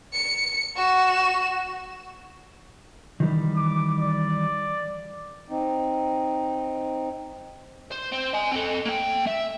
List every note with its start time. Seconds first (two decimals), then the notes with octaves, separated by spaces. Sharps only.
0.13 C#7
0.76 F#4 E7
3.20 D#3 E3 G3
3.56 D6
3.99 D5
5.50 C4 D#4
7.91 C5
8.12 C4
8.33 D#5 G#5
8.52 C4 A4
8.85 A#3 G5
9.27 E5